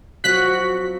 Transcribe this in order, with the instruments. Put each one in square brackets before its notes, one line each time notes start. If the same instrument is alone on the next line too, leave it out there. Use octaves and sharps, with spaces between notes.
[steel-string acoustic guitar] F3 F#3 C4 [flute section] F#4 [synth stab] F#6 B6